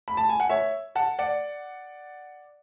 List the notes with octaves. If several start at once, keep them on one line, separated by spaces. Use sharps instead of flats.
B5
A5
G#5
F#5
C#5 E5
F#5 A5
D5 F#5